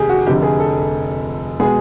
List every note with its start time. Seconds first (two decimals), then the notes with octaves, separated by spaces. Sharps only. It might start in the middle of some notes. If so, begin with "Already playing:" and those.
Already playing: F1 D#2 G4 G#4
0.09 F#4
0.26 F1 F2 D3 G4
0.43 G#4
0.60 A4
1.60 B2 G#3 B3 G#4